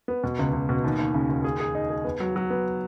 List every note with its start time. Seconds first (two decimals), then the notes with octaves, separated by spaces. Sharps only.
0.08 B3
0.24 B2
0.39 C#2
0.53 C#2
0.69 B2
0.84 D#2
0.99 D#2
1.14 C#3
1.29 D#2
1.44 G#4
1.60 G#4
1.75 D#4
1.90 G#4
2.05 B3
2.20 F#3
2.36 F#3
2.50 B3